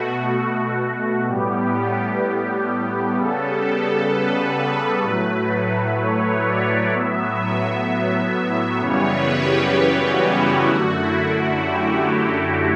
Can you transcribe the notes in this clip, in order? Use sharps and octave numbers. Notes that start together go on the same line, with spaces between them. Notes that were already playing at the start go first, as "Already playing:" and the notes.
Already playing: B2 A3 F#4
A2 G3 B3 G4
C#3 G3 B3 A4
A4
B4
A2 F#3 A3
C#5
D5
A2 F#3 B3 E5
F#2 C#3 E3 G3 B3 C#5
B4
G4
G4
F#4
E4
F#2 D3 A3 F#4
E4
F#4
G4